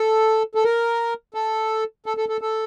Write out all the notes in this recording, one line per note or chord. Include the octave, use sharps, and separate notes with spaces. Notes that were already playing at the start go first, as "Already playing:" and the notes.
Already playing: A4
A4
A#4
A4
A4
A4
A4
A4